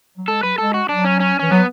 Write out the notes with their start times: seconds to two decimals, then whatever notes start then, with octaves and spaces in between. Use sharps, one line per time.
0.18 F#3
0.28 G#3 A4
0.43 F#3 B4
0.58 G#3 A4
0.74 F#4
0.89 F#3 D4
1.04 C#4
1.20 C#4
1.39 E3 C#4
1.51 F#3 B3